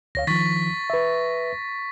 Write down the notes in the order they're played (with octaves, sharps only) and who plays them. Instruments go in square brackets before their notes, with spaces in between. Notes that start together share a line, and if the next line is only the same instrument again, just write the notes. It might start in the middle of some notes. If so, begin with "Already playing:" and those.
[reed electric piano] D2 C#5 F5 [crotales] A#6
[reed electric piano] D#3 F3 [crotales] C#6 A6 B6
[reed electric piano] B4 E5